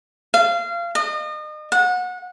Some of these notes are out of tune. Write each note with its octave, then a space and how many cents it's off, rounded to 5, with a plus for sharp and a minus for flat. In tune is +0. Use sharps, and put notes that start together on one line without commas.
F5 -25
D#5 -35
F#5 -25